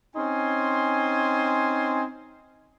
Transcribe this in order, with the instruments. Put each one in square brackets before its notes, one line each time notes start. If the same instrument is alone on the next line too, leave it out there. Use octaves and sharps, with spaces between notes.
[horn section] C4 C#4 D#4 G#5 C6